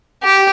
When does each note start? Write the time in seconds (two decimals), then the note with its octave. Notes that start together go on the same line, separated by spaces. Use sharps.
0.23 G4